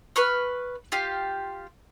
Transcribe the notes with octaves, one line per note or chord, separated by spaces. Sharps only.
B4 B5 C#6 F6
F4 G4 F5